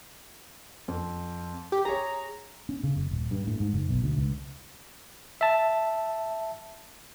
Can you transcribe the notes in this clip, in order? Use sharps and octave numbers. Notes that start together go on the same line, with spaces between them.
F2
G4
G#4 C#5 A#5
C#4
C#3
F#1
D#1
G2
A2
G#2
F#1
B1
D2
C#2
E5 A5